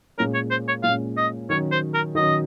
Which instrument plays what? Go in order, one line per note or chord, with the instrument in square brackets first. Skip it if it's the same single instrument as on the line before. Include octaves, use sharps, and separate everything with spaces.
[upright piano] A#2 G#3 C#4 [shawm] A#4
[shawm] C#5
C5
C#5
[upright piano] A#2 G#3 C#4 [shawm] F5
[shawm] D#5
[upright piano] D#3 F#3 C#4 [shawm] C#5
[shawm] C5
A#4
[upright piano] D#3 F#3 C#4 [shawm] D#5